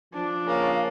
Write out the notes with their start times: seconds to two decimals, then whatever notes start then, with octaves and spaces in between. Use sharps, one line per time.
0.14 F3 D4
0.47 C#3 A#3